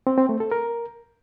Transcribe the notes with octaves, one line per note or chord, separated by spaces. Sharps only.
C4
C4
A3
A4
A#4